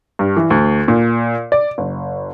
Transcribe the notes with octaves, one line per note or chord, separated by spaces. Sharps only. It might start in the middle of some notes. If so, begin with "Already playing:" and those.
G2
E3
D2
A#2
D5
F#1